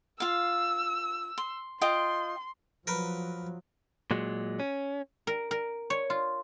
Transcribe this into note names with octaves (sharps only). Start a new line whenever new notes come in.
F4 F5 E6
C6
F4 D#5 G5 C6
F3 F#3 A#4 B4
A#2 F#3 G#3
C#4
A#4
A#4
C#5
F4